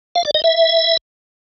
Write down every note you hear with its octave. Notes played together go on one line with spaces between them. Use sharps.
F5
D5
D#5
E5